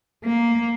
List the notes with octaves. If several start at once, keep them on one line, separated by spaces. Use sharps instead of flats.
A#3